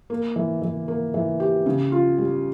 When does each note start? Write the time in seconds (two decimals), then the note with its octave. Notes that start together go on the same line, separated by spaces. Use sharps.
0.10 A#3
0.36 E3
0.62 E3
0.88 A#3
1.14 E3
1.40 G4
1.66 C#3
1.92 F4
2.18 G3